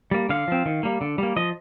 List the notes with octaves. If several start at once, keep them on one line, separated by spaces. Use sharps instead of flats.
G3 A#3
D3 F5
F3 C4
D#3
G3 A#3
D3
G3 A#3
F3 D#5